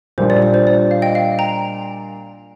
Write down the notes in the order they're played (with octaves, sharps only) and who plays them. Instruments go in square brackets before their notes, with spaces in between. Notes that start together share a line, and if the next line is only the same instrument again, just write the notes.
[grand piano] A#2 G3 D4 F4 [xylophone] C5
[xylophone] D5
D5
C5
D5
F5
D#5 G5
F5
G5 A#5